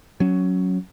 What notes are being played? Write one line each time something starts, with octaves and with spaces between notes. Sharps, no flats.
F#3 C#4